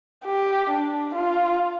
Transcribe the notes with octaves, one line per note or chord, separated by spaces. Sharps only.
G4
D4
F4